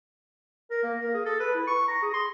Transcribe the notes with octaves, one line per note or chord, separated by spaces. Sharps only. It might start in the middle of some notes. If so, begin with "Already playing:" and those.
A#4
A#3
A#4
G#4
A4
B4
E4
C#6
A#5
G#4
C6